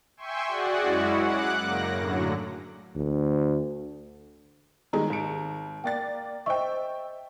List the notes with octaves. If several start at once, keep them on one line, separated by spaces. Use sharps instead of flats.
E5 G5 G#5 C6 C#6
F#4 G#4 D5 F#5
F#2 G#3 C#4 E4 F#4
F#5 D6 F#6
F#2 C#3 A#3 A#6
A2 D3 F#3
D2
D#3 G3 G#3 A#5
G#1 D7
A#3 D5 G5 A6
C5 D#5 E5 G5 C#6